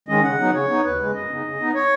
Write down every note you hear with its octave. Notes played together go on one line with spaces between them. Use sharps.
D#3 G#3 C#4 D#5
C#3 F#5
F#3 B3 D#4
C#3 C#5
B3 D#4
D#2 B4
C#3 G#3
F#2 D#5
C#3 B3 D#4
C#3
B3 D#4
C#5